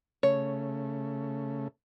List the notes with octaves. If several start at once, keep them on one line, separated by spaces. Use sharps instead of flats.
C#3 A3 C#5